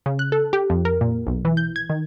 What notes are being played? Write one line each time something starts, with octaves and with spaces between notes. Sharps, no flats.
C#3
F#6
A4
G4
F2
A#4
A#2
B1
E3
G6
G#6
D#3